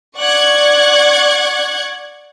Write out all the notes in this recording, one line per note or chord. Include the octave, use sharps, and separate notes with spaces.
D5 F#5 C#6 F#6 G#6